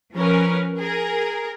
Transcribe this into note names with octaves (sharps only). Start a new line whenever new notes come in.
F3 C#4 A#4 B4
G#4 A#4